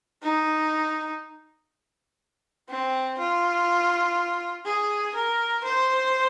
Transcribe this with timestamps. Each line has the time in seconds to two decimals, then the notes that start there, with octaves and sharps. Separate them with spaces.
0.23 D#4
2.69 C4
3.19 F4
4.66 G#4
5.15 A#4
5.64 C5